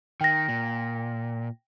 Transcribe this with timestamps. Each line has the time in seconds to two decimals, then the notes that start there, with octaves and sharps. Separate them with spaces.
0.21 D#3 G5 A#6
0.48 A#2